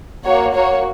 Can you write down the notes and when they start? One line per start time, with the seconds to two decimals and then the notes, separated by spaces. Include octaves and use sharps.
0.25 A#3 F#4 C#5
0.54 A#3 F#4 C#5